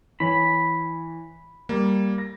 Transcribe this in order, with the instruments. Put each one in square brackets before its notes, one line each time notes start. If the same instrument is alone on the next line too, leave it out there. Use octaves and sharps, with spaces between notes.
[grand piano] E3 C#5 [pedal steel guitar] B5
[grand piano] G3 [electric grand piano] A#3
[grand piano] A#6